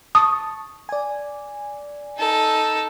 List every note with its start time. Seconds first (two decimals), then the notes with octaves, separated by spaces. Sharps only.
0.15 A5 C#6 D#6
0.89 D5 G#5
2.18 D#4 A4